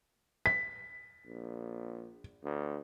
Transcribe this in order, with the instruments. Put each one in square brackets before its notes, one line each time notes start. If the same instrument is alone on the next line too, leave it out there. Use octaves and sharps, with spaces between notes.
[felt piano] B6
[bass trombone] A#1
D2